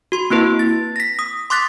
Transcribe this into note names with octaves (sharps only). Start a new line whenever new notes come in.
F#4 C6
A#3 C4 E4 B4
A6
A#6 B6
D#6
C6 D6 F#6 A6 B6